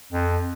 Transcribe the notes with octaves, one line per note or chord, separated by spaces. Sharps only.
F2